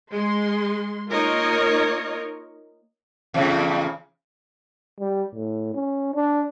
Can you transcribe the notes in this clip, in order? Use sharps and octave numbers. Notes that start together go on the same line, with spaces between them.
G#3 C6
A#3 D#4 F4 A#4 C#5 D#5
E2 A2 C#3
G3
A2
C#4
D4